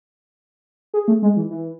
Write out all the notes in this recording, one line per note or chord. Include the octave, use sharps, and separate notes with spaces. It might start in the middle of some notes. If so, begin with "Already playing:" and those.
G#4
A3
G#3
E3
E3